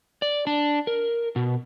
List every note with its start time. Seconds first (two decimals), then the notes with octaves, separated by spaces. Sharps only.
0.22 D5
0.47 D4
0.87 A#4
1.36 B2